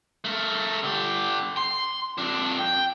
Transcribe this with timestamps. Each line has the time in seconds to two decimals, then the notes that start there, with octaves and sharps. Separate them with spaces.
0.25 A3 A#4
0.83 D3 G4
1.57 C6
2.18 F2 D4
2.59 G5